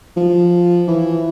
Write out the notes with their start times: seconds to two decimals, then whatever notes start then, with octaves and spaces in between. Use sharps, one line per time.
0.17 F3
0.88 E3